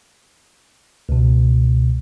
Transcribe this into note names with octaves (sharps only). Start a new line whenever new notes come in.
C#2 B2